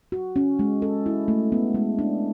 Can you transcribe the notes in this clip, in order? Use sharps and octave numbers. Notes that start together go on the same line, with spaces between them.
F#4
C#4
G#3
A4
E4
A3
B3
G#3
D4